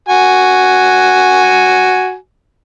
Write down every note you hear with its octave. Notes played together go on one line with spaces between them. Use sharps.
F#4 G#5